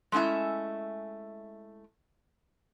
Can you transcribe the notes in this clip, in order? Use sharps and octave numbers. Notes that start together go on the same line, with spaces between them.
G#3 A3 C#4 E4 E5